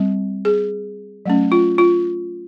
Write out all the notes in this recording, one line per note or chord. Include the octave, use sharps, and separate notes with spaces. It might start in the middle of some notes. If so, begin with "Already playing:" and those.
Already playing: G3 C4
G#4
F#3 A3 C#4
F4
F4